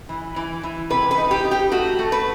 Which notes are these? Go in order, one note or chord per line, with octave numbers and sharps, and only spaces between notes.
E3
E3
E3
C3 B4
B4
D#4
G4
D#4
G4
A3 F#4
A3
B4